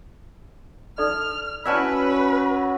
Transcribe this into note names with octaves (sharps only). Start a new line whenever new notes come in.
D#4 A4 D5 F6
C#4 F#4 B4 D5 E5 G#5 A5